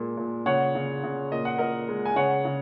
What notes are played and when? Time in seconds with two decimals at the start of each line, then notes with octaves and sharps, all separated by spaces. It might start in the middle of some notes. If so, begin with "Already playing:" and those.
Already playing: A#2 G#3
0.17 A#2
0.46 C#3 C#5 F#5
0.75 C#3
1.04 C#3
1.31 A#2 D#5
1.45 F#5
1.58 A#2 A#4 D#5
1.89 G#3
2.06 G#5
2.16 C#3 C#5 F#5
2.45 C#3